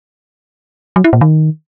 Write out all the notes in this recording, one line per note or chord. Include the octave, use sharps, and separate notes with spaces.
F#3
E4
A#2
D#3